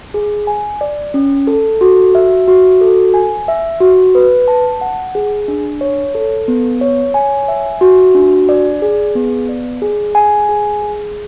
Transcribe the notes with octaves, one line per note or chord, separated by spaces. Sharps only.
G#4
G#5
D5
C#4
A4
F#4
E5
F#4
A4
G#5
E5
F#4
B4
A5
F#5
G#4
D4
C#5
A4
B3
C#5
G#5
E5
F#4
D4
D5
G#4
B3
D5
G#4
G#5
G#4
G#4